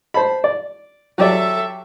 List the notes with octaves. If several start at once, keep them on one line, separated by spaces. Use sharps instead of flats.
C5 A5 B5
D5
F#3 G4 A4 D5 E5